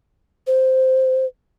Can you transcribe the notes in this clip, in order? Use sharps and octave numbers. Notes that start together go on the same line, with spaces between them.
C5